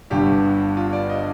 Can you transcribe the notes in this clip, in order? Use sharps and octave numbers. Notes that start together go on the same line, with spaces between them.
G1 G2 D3 G4
F4
D5
D#5